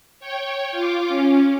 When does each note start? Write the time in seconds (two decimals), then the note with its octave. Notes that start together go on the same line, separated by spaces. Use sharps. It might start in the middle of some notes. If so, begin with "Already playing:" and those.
0.20 C#5 G5
0.72 F4 D6
1.09 C#4